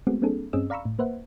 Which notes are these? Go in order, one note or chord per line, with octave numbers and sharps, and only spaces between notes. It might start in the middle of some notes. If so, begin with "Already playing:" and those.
G#3 A3 B3 C4 F#4 G#4
G3 A#3 C4 D4 G#4 A4
G2 C4 C#4 G#4 D#5 E6
D5 F5 A#5 B5 C#6 E6
A2
A#3 B4 C5 E5 F#5